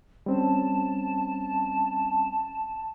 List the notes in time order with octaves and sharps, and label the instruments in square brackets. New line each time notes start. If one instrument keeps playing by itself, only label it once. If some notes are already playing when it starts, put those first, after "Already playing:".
[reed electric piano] G3 C4 C#4 [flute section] A5